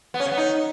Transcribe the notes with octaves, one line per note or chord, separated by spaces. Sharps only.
B3
C#4
C#3
B3
D#4